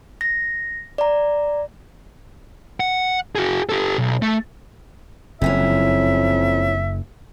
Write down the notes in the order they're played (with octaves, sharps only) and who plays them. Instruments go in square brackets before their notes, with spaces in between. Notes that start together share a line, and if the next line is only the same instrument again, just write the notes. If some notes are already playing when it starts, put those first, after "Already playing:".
[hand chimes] A#6
D5 A#5
[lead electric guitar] F#5
F#4 G#4
G4 A4
B1
A3
[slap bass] F#1 [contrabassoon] F2 [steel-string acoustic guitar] C3 E3 C#4 [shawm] E5